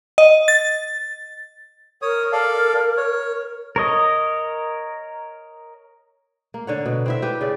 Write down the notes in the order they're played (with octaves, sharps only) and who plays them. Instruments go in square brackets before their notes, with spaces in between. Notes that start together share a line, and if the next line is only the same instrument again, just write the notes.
[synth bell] D#5
A6
[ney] A#4 [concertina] C#5 D#6
[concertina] A4 D5 F5
C#5
[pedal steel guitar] A#4 C#5 D#5
[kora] A#3
D3 C#5 F#5
B2
C4 E4 E5
G4 B4
C#3 D5